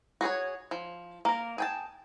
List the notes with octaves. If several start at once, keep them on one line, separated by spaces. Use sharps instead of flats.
F#4 G#4 C5 C#5
F3
A#3 A#4
G#4 G5 A5